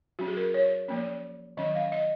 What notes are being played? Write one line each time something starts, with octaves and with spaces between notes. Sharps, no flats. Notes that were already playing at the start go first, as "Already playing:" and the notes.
F#3 C#4 F#4
G#4
A#4
C#5
F3 A#3 C#4
D#3 F#3 C#4 D#5
F5
D#5